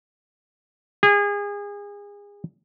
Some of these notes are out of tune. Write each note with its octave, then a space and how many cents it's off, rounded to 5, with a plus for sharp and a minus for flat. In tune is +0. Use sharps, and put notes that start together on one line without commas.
G#4 -30